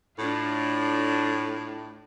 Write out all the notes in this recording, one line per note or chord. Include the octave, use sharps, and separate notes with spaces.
A2 D4 F4